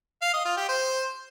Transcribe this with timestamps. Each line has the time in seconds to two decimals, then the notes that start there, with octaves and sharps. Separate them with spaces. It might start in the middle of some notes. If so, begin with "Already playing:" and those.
0.22 F5
0.34 D#5
0.45 F4
0.57 G4
0.69 C5